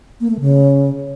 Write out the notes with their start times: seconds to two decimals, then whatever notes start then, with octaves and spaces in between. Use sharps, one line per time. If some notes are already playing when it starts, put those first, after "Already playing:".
0.20 A#3
0.30 A3
0.40 C#3